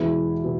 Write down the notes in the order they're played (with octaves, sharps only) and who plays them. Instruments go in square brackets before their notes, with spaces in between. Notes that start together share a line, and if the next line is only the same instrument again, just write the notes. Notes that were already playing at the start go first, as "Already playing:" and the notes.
Already playing: [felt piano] E2 B2 G#3 E4
B2